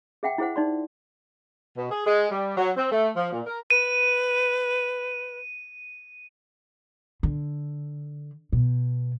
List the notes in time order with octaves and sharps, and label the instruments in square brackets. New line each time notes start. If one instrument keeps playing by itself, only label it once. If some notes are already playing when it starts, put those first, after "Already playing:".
[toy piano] G#4 E5 F#5 G5
E4 G#4 C5 F#5
D#4 D5 C6
[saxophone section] B2
G#4
G#3
G3
F#3
C4
A3
F3
A#2
A#4
[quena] B4 [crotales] D#7
[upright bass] D3
B2